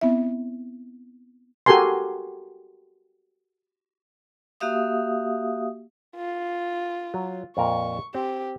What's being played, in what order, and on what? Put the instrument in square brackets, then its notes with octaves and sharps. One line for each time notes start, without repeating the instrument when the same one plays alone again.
[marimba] B3 C4 E4 E5
[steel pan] F#4 G4 A4 A#4 G#5 C6
[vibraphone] A#3 F#4 G4 E5 F5 D#6
[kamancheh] F4
[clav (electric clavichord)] F#3
[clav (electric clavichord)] F2 A#2 A#4 [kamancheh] C#6
[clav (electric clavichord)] C4 [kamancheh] G4